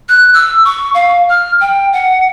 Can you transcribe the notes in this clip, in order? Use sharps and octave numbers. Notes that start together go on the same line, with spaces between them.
F#6
E6
C#6
F5
F6
G5
F#5